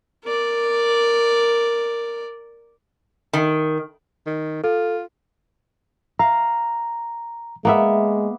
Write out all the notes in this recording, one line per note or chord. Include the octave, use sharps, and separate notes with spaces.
A#4 D5
D#3
D#3
F4 A4
F5 A#5
G#3 A#3 B3 E5